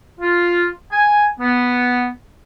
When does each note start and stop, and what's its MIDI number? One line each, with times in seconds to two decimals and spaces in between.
0.20 0.66 65
0.92 1.25 80
1.40 2.08 59